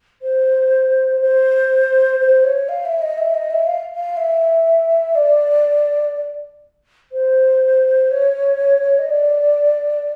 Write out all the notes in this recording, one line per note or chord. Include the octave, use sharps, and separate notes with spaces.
C5
C5
C5
C#5
F5
E5
D#5
E5
D#5
E5
F5
F5
E5
D5
C5
C#5
D#5
D5